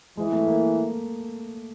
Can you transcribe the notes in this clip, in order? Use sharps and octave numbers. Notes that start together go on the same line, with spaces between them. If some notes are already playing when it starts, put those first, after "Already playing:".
E3 G#3
A3
A#3